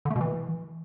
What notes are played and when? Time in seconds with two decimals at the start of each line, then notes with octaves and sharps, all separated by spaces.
0.05 D3
0.10 A3
0.16 B2
0.21 E3